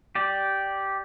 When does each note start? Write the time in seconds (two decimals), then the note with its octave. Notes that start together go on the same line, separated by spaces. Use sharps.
0.15 G4 D5